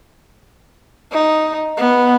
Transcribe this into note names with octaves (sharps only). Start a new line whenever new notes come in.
D#4
B3